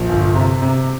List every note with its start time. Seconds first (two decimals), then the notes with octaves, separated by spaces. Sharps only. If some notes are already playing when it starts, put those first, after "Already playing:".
Already playing: A#1
0.09 G1
0.35 C3
0.62 C3